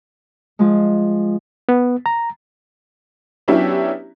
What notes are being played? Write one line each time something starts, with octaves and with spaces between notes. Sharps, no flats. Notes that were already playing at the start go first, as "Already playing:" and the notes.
F3 G#3
B3
A#5
F#3 B3 C#4 D4 E4 G4